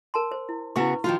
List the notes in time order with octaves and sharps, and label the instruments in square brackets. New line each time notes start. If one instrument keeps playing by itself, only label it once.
[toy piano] A#4 A5 C6
C5
E4
[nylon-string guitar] C#3 B3 F#4 [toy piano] E4 B4 C#6
[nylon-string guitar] D#3 F3 F4 [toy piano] F#4